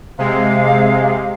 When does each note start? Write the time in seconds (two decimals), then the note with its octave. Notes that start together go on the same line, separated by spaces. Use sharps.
0.18 C3 G#3 F5